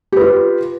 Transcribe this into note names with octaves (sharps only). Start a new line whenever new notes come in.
F4 G4 B4